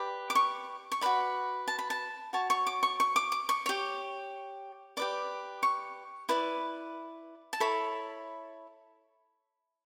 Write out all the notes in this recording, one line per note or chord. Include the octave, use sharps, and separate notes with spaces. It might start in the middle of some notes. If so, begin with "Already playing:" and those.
Already playing: G4 B4 D5
D6
C#6
C#6
F#4 B4 D5 B5
A5
B5
A5
F#4 C#5 A5
C#6
D6
C#6
C#6
D6
D6
C#6
G4 C#5
G4 B4 D5 D6
C#6
E4 B4 D5
A5
E4 A4 C#5 B5